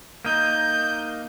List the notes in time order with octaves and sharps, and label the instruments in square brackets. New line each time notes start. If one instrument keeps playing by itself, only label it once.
[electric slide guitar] A#3 D#4 [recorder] G6